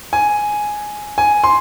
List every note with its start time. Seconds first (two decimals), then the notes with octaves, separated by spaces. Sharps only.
0.13 G#5
1.18 G#5
1.44 C6